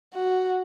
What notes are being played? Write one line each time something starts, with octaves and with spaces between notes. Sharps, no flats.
F#4